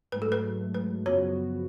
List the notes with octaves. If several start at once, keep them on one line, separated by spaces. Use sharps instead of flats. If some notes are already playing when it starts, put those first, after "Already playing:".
G#2 F#3 A3 B4
A4
B4
B4
F#2 C#3 F3 B3 F#4 C#5